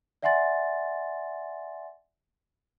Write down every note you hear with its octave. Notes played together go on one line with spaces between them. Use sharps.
D5 E5 F#5 G#5 C6 A6